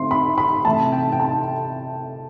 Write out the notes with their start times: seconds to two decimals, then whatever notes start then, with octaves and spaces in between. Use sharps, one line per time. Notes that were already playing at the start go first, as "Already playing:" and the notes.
Already playing: D3 A3 C4 C6
0.11 B5
0.38 B5
0.65 C3 E3 A3 A5
0.92 G5
1.12 G5
1.20 A5